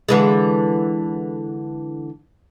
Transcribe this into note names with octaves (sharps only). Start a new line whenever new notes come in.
D3 E3 G#3